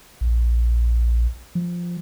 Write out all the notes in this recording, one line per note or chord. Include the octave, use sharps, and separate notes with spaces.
A#1
F3